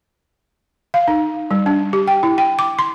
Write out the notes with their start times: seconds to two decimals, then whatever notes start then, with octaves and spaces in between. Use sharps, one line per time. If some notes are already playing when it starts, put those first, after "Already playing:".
0.94 F5
1.08 D#4
1.51 G3
1.66 D4
1.93 G4
2.08 G5
2.23 E4
2.38 G5
2.59 D6
2.79 C6